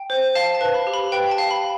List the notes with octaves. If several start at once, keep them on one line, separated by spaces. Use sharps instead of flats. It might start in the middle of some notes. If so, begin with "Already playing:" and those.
Already playing: G5
C5
F5 A5
A5
B4
B5
G4
B5
B4 G5
A5
F5
B5